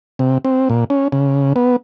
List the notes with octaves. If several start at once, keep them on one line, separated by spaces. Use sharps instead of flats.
C3
C4
A#2
C#4
C#3
B3